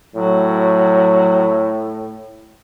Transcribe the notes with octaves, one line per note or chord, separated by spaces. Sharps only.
A2 F#3